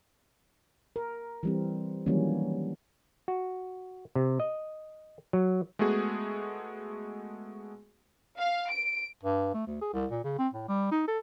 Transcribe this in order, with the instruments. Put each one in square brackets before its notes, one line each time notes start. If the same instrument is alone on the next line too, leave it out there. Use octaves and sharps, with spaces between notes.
[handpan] A#4
E3 G3 C4
D#3 E3 F#3 G3 A#3 C#4
[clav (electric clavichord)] F#4
C3
D#5
F#3
[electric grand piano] G#3 A3 B3 F#4 G#4
[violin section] F5
D7
[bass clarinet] G2
A3
D2
G#4
C2
A#2
C#3
C4
A2
G3
D#4
A4